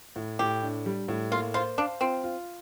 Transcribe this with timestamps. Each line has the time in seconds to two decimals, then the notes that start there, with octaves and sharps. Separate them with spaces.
0.16 A2
0.39 A2 G4
0.62 D4
0.86 G3
1.08 A2
1.32 A#3 F4
1.54 F4 C5
1.78 D4 F5
2.01 C4 F4
2.24 F4